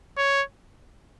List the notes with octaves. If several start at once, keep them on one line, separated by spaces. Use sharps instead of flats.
C#5